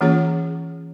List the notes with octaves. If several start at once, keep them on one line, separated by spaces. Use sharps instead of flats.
E3 A#3 C#4 F4 G#4 C#5